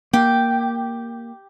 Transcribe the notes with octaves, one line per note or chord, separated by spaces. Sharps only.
A#3 G4